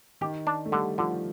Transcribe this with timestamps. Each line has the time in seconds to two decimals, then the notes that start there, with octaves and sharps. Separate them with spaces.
0.21 D#3 G4
0.47 D4
0.65 A3
0.72 D3 G3
0.98 D3 F3